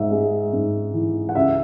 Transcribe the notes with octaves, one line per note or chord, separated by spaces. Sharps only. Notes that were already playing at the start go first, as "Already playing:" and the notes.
Already playing: G#2 E5
G#3
G#2
E3
F#5
C#2 E5